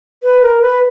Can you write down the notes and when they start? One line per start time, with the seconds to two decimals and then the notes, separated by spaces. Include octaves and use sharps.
0.23 B4
0.42 A#4
0.62 B4